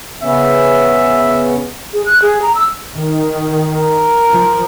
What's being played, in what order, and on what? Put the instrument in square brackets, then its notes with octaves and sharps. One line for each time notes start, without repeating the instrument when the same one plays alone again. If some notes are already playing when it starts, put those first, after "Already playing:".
[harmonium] C#3 B3 C#4 [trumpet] E5
[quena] G#4
F#6
G#4
A#5
E6
[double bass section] D#3
[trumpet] A#4
[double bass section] F3